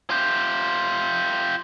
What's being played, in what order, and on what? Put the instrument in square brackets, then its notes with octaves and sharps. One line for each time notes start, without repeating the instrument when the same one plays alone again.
[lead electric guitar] F4 G4